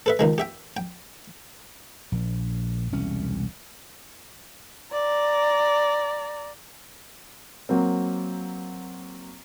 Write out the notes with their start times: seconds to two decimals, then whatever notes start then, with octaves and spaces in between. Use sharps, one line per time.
0.06 A4 B4 E5
0.19 C#2 D#3 G#3
0.38 G4 E5 G5
0.77 G5
2.12 A#1
2.92 E1 C2 C#4
4.93 D5 A#5
7.69 F#3 A#3 C4